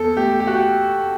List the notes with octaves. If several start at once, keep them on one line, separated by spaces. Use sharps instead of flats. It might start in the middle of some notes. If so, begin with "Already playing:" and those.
Already playing: E2 A4
A3 G4
G4
F#4
G4